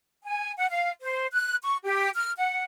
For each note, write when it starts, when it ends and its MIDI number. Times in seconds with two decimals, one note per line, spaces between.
0.24 0.52 80
0.57 0.65 78
0.70 0.90 77
1.01 1.27 72
1.32 1.55 90
1.63 1.77 85
1.84 2.10 67
2.15 2.31 89
2.37 2.62 78